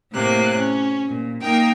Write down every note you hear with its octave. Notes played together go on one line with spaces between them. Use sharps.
A2 C3 A#3 F#6
C#4
A#2
A#3 D#4 A#4 G5